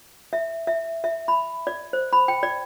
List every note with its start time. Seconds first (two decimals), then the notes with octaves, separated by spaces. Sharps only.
0.33 E5
0.67 E5
1.04 E5
1.28 B5
1.67 D5
1.93 C5
2.13 B5
2.28 G5
2.43 D5